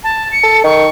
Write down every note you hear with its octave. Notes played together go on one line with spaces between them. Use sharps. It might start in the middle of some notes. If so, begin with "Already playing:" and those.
A5
C#7
A4
D#3 C#6